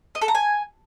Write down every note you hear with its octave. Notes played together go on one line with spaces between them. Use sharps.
D#5
A4
A#5
G#5